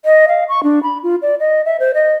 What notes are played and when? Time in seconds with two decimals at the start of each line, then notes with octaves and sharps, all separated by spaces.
0.05 D#5
0.28 F5
0.49 C#6
0.63 D4
0.83 B5
1.03 F4
1.22 D5
1.40 D#5
1.65 E5
1.80 C5
1.94 D#5